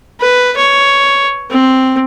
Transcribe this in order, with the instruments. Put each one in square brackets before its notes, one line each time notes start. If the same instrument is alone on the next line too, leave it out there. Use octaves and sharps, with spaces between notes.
[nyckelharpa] B4
C#5
C4